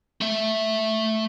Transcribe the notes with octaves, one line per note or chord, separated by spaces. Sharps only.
A3 E5